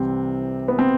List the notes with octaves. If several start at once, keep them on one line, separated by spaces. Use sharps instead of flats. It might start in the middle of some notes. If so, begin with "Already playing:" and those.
Already playing: C2 C3 E3 G3 C4
B3
C4